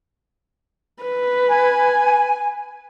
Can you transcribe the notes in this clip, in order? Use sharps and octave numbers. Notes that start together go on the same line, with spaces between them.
B4
G#5